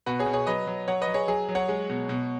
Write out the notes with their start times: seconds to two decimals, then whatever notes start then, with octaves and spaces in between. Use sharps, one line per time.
0.06 B2 F#4 B4
0.19 G#4 C#5
0.26 B2
0.33 G#4 C#5
0.47 F#3 B4 D#5
0.67 F#3
0.88 F#3 C#5 F#5
1.01 B4 D#5
1.07 F#3
1.14 G#4 C#5
1.28 F#3 G#4
1.49 F#3
1.55 C#5 F#5
1.69 G#3
1.90 B2
2.09 B2